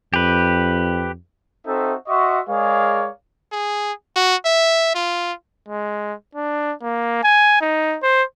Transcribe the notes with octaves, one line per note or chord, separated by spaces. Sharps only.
F2 G4 B4
C4 D#4 F#4 A4 E5
F#4 D#5 E5 C6 C#6
G#3 G#4 A#4 C#5 D5 F5
G#4
F#4
E5
F4
G#3
D4
A#3
G#5
D#4
C5